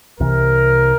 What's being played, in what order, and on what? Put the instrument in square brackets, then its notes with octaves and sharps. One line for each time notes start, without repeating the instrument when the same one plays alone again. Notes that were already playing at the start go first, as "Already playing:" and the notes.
[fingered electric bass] C2 C3 E3 [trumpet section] A#4